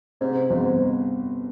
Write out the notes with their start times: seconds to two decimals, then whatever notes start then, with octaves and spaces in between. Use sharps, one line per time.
0.21 G#2 C3
0.50 G1 G#2